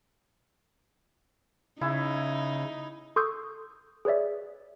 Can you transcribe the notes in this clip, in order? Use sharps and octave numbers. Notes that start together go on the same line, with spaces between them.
C#3 D#4 E4
A4 C6 C#6 D#6 E6 G6
G#4 B4 C#5 D5 E5